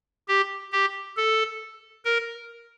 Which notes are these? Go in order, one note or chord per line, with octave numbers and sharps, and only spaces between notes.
G4
G4
A4
A#4